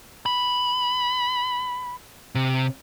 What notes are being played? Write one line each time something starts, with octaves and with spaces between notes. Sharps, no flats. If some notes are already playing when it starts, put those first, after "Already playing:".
B5
C3